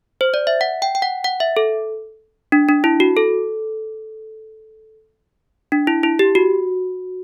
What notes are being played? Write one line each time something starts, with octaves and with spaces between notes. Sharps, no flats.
C5
D5
E5
F#5
G5
G5
F#5
F#5
E5
A4
D4
D4
E4
F#4
A4
D4
E4
E4
G4
F#4